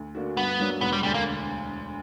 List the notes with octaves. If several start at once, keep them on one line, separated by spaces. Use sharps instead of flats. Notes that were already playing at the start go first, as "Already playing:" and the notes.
Already playing: D2
D3 A#3 D4 F#4
G2 B3
F#3 A#3 D4
E1 B3
G3
D2 D3 G3
A#3